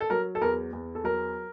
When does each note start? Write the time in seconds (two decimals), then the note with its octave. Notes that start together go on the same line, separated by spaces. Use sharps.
0.01 A4
0.10 F#3 A#4
0.35 A4
0.41 E2 A#4
0.73 E2
0.95 A4
1.04 F#3 A#4